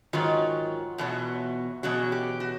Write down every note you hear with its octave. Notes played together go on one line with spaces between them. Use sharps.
G#2 D#3 F#3 F4
E2 B2 F#3
E2 B2 F#3 F#4
G4
F#4